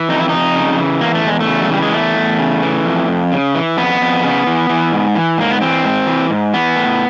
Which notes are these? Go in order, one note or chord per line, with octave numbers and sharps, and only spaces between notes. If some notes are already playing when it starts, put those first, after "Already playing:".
Already playing: E3
F2 D#4
E4
F2 D#4
C#3
E3
E2 A#3
A3
E2 G#3
A3
C#3
F#3
E3 G3
G#3
E2 A3
E2
C#3
E3
F2
F2
C#3
E3
F2 B3
F2
C#3
E3
E3
G#2
E3
G#2 A#3
B3
E3 C4
G#2
E3
G#2
E3 B3
A2